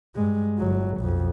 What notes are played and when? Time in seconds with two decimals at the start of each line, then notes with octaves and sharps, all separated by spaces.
0.15 G2 G#3
0.58 G1 F#3
0.97 B1 F2